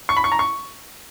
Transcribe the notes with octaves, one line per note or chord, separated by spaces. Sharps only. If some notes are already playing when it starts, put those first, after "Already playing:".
C#6
B5
C#6
A#5
C#6